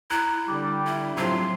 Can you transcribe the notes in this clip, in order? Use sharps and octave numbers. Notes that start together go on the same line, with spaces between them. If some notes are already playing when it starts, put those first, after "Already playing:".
E4 A#5 F#6
D3 G3 D6
E4 E5
A2 C3 F3 F#3 C6